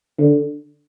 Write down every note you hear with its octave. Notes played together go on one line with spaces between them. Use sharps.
D3